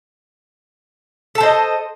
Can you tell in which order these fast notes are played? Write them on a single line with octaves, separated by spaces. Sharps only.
A4 A5 C5 D#5